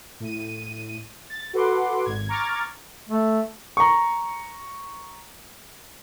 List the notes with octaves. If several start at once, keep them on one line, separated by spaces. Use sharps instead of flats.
A2 D#7
A6
F#4 A4 B4 F#5 C6 D6
G#1 G#6
A#5 C#6 D6 F6 G#6 A6
A3
A#5 C#6